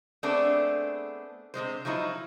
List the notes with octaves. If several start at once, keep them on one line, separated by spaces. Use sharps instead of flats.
A3 B3 C4 D4 G#4 A4
C3 E3 G#3 C5
F3 F#3 G#3 D#4 E4